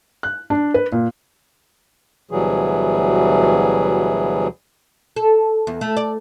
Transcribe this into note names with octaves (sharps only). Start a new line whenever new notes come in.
F#6
D4
B4
A#2
D2 B2 E3 F#3 G3 G#4
A4
E2
A3
D5